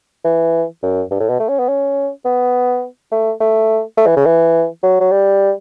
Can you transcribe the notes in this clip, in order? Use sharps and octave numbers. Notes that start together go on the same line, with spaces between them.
E3
F#2
G2
A2
B2
A3
C#4
B3
C#4
B3
A3
A3
A3
E3
C#3
E3
F#3
F#3
G3